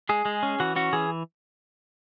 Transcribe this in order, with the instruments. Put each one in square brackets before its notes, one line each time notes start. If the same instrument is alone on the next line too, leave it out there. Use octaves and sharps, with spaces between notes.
[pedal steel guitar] G#3 G#4
G#3
C#4
E3 F#4
C#4 F#4
E3 G#4